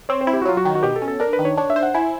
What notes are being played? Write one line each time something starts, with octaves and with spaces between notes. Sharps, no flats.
C4 C#5
C5
E4
G4
F#4
F#3 F4
F#4
D#3
F#4
B2 G4
A4
C#4
A4
D4 A#4
B4
D#3
C#5
D4 C#5
E5
C5
F#5
E4 G#5